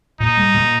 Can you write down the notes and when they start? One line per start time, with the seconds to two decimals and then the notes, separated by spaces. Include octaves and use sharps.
0.20 A#2 D#4
0.37 G3
0.54 A#2